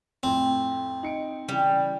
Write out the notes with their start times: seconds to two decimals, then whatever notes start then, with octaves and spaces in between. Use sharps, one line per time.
0.23 F2 A2 C4
1.03 D#4 C#7 D7
1.49 C#3 E3 G3